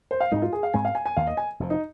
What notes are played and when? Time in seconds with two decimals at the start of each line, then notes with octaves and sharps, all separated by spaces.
0.11 C5
0.20 F5
0.31 G#2 G#3 C4 D#4
0.42 F4
0.53 G#4
0.63 F5
0.74 G#2 G#3 C4 G#5
0.85 F5
0.95 G#5
1.06 G#5
1.17 D#2 D#3 A#3 F5
1.27 D#5
1.37 G#5
1.60 F1 F2 C3 F3
1.70 D#4